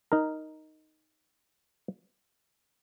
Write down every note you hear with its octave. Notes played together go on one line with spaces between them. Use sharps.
D#4 A#4